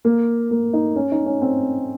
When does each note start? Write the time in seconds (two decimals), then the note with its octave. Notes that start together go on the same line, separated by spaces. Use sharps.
0.05 A#3
0.51 A#3
0.73 D#4
0.96 C#4
1.12 D#4
1.26 C#4
1.42 C4